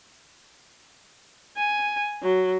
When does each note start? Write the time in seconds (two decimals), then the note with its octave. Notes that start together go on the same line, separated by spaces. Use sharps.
1.57 G#5
2.23 F#3